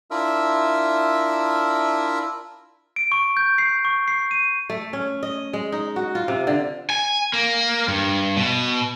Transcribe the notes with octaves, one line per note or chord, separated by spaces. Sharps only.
D4 E4 F4 A#4 E5 E6
D7
C#6
G6
C7
C#6
C7
D#7
A3
C#4
D#5
G#3
D#4
F#4
F4
C3
D3
G#5
A#3
G2
B2